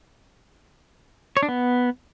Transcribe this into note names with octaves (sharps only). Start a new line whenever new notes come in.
C#5
D4
B3